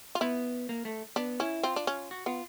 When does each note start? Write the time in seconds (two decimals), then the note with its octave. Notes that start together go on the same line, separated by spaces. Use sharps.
0.15 F4
0.21 B3 E4
0.69 A#3
0.85 A3
1.16 B3 D4
1.40 C#4 E4
1.63 C4 F4
1.76 D4
1.87 C#4
2.11 F#4
2.26 B3 F4